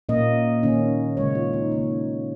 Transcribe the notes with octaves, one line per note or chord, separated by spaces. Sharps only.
A#2 A#3 C#4 D#5
D#3 A#3 C#4
C#3 G#3 C#4 C#5
F4
D#4
C#3 A#3 C#4 F4